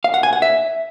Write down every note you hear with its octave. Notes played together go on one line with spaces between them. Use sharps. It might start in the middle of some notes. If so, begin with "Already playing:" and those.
F5
F#5
G#5
F#5
E5